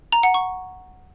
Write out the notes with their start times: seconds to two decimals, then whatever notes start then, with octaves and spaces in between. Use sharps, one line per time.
0.12 A#5
0.23 F#5
0.34 C#6